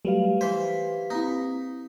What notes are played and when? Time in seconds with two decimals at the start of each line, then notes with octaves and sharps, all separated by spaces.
0.05 F#3 G3 A3 G4 B4 F5
0.41 E3 C5 B6
1.10 A#3 C4 D#4 E4